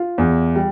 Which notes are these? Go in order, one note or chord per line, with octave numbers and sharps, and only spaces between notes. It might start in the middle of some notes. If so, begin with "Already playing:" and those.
Already playing: F4
E2
G3